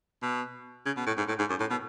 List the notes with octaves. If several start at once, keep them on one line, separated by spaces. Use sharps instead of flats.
B2
C#3
B2
A2
G#2
A2
G#2
F#2
A2
B2